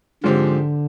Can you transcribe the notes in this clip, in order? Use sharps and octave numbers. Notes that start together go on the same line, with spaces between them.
G#2 D3 F3 G#3 C4 G4